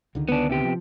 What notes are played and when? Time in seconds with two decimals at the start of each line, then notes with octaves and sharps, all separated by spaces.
0.15 C#2 D3 D#3
0.29 B3 D4
0.49 C3 B3 G4
0.64 F3